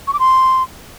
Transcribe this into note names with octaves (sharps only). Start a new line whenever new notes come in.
C#6
D6
C6